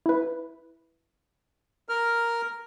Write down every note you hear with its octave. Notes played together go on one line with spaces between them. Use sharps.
E4 B4
A#4 F6